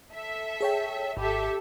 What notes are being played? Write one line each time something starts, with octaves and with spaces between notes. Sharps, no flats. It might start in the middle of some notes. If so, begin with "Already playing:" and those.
A4 E5
G#4 C#5 G5
G#1 G4 A4 E5